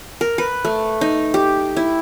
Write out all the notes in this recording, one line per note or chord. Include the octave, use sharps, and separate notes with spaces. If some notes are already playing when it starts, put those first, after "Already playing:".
A#4
B4
A3
D#4
G4
E4